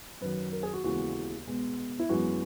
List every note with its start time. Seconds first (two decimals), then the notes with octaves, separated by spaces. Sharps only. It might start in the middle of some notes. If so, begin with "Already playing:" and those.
0.21 F#2 D#3 F#3 B4
0.53 A#4
0.63 G#4
0.74 F#4
0.84 D#2 C#3 E3 G#3 B3 F#4
1.47 B2 G#3 B3
1.99 E4
2.09 F#2 E3 G#3 B3 F#4